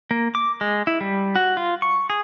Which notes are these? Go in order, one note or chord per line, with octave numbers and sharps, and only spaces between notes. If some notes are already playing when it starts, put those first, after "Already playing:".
A#3
D6
G#3
E4
G3
F#4
F4
C#6
G#4